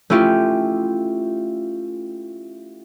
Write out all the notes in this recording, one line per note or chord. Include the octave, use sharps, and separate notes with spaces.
A3 C#4 E4 F4 G4